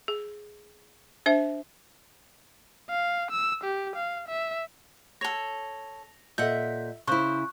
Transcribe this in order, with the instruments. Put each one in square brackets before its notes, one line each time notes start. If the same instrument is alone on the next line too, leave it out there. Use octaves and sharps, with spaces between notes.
[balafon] G#4
D4 C5 E5
[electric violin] F5
E6
G4
F5
E5
[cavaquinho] A4 C#5 [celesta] A#6 F7
[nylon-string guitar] A#2 D#5 F#5 [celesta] A4 G6 [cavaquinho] E5
[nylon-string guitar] C#3 E4 [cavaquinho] C5 [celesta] C#6 F#6